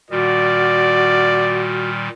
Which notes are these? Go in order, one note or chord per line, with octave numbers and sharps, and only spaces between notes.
A#2 D#3 G3 F#4 D5